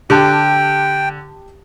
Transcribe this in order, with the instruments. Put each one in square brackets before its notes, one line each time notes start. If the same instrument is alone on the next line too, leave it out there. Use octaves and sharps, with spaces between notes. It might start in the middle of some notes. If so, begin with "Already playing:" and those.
[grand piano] D3 [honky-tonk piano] G4 A5 F#6 [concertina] G5